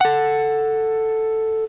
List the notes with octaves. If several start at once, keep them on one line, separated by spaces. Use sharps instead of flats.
A4 F#5